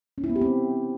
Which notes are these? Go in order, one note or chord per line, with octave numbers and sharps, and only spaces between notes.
C#4
E4
B3
G4
C4